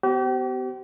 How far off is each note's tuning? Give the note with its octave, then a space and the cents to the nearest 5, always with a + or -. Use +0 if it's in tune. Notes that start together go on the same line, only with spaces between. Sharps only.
B3 +35 G4 -40 C5 +0